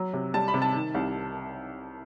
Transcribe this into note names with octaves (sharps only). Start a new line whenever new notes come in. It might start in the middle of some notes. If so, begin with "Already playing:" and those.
Already playing: F#3
C3
G3 A5
B5
C3
A5
D#3
C2